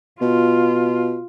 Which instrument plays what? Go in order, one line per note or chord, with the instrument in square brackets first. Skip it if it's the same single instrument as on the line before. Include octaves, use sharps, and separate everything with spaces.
[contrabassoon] B2 [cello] F4